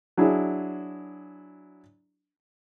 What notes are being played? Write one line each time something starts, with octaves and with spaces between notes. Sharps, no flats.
F#3 D4 E4 G#4